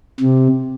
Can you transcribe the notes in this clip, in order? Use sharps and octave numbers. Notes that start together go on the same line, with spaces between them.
C3